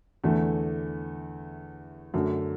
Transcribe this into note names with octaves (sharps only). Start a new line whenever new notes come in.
E2 D3 A3
F#2 D3 F#3 A3